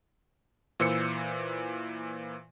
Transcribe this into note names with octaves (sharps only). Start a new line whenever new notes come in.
A#2 E3 C5 E6 C#7